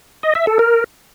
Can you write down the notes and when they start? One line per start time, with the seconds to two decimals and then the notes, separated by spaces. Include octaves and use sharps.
0.23 D#5
0.35 E5
0.47 A4
0.59 A#4